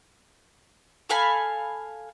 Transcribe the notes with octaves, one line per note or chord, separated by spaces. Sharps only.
A4 F5 G#5 B5